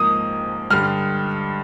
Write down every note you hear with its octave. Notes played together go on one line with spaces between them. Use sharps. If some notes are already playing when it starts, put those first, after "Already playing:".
Already playing: G#2 F3 A#3 D#6
G2 D3 G3 F6